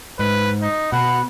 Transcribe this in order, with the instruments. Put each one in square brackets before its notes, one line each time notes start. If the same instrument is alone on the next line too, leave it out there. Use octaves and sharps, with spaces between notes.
[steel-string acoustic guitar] G#2 [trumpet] B4
[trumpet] D#4
[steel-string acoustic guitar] B2 [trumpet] F#5 [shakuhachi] B5